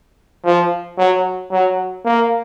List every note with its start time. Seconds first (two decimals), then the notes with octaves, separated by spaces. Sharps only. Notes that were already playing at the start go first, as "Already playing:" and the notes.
0.45 F3
0.98 F#3
1.51 F#3
2.05 A#3